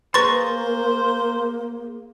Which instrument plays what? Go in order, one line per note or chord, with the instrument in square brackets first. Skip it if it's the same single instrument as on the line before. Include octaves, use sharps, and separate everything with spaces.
[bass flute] A#3 [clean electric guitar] G#4 A#5 C6 [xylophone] B4 C#6 A6 [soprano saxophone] C5